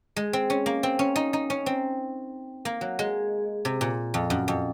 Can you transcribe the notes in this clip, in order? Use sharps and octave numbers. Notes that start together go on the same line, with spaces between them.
G#3
C4
C#4
A#3
C4
C#4
D#4
D#4
C#4
C4
A#3
F#3
G#3
C3
A#2
F2
F#2
F2